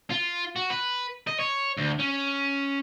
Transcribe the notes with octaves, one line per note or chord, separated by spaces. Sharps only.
F4
F#4
B4
D#5
C#5
D2
C#4